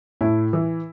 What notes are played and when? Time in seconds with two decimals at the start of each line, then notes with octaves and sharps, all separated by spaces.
0.21 A2 E4
0.53 E3